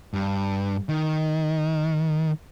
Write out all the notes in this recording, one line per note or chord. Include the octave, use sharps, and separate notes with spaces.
G2
D#3